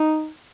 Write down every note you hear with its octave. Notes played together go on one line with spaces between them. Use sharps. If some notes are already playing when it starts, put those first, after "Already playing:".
Already playing: D#4